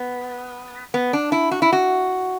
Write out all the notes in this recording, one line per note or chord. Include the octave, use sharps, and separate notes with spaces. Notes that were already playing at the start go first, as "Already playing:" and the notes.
Already playing: B3
B3
D4
E4
F#4
E4
F#4